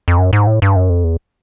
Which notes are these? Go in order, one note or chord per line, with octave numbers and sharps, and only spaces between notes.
F2
F#2
G#2
A2
G2
F#2
F2
E2